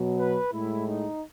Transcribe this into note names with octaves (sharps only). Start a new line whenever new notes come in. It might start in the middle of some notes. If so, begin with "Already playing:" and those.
Already playing: B2 F#3
B4
A2 G#3 E4
D#4